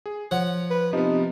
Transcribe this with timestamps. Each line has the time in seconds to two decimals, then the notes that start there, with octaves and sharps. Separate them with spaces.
0.06 G#4
0.31 F3 C#5 F#5
0.71 B4
0.93 C3 F3 B3 D#4